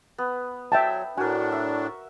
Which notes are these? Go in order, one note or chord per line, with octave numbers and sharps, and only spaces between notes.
B3
F#3 E5 G5 A5
A2 D4 F#4 A#4 G#5
E5